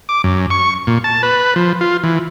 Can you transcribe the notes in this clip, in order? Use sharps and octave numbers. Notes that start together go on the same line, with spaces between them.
D6
F#2
C#6
A#2
A5
B4
F3
F4
E3